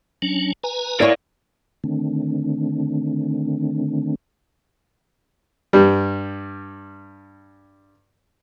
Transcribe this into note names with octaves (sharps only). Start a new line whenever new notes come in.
F#3 C#4 D4
B4 G#5 A#5
E4 A#4 C#5 D5
D3 D#3 A3 C4 D4
G2 G3